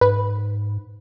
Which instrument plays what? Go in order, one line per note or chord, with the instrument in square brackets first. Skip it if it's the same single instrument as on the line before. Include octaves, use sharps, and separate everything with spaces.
[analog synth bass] G#2 [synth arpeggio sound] B4